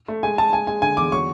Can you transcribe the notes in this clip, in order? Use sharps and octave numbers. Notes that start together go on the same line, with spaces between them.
A3
G#3 G#5
G#3 A5
G#3 G#5
G#3 G#5
D3 G#5
E2 D6
F#3 C#6